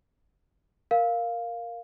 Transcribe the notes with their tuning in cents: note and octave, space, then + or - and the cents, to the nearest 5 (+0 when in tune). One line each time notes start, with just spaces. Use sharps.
A#4 +0 F5 +0